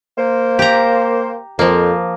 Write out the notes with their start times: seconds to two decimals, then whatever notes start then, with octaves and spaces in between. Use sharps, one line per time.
0.18 A#3 C5
0.59 G4 A#5
1.59 F2 F3 A#3